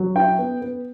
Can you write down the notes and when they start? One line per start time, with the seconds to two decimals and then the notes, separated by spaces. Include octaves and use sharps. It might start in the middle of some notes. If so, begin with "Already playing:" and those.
Already playing: F#3
0.16 E4 G5
0.39 B3
0.62 B3